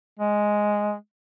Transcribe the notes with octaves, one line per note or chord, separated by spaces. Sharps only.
G#3